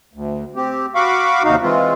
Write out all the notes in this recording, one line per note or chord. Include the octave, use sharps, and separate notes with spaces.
D2
C4 G4
F#4 F5 B5 C#6 D6
D#2 C3 D#4 F#4 F5
E3 G#3 C4 F4